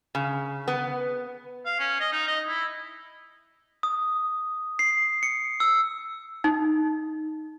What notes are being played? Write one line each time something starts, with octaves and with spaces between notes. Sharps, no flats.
C#3
B3
F5
C#4
D#5
D#4
D#5
E4
D#6
C7
C#7
E6
D#4